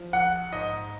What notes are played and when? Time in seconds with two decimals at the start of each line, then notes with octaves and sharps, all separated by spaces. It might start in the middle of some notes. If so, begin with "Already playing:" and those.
Already playing: F3
0.13 A#1 F#5
0.52 G#2 D#5